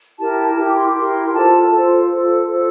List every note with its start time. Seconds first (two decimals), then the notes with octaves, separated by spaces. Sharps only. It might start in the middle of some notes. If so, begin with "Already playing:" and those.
0.19 E4 G4 A#4 A5
0.58 E4 G4 A#4
0.67 D6
0.76 C6
0.86 D6
0.94 E4 G4 A#4 C6
1.27 G5
1.32 F4 A4 C5 A5
1.70 F4 A4 C5
2.08 F4 A4 C5
2.47 F4 A4 C5